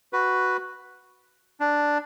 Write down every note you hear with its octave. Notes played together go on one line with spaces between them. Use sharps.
F#4 B4
D4